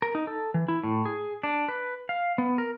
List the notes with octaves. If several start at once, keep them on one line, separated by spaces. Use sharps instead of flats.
A#4
D#4
A4
E3
E4
A2
G#4
D4
B4
F5
B3
A#4